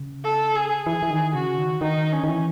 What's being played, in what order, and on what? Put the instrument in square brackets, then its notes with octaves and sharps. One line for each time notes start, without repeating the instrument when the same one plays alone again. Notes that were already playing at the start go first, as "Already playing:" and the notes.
Already playing: [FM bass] C#3
[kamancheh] A4
G#4
[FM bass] E3 [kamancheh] G#4
[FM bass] E3
D#3
[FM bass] C#3 [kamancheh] F#4
[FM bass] D#3
[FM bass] D#3 [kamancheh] D#4
[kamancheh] C#4
[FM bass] D#3
E3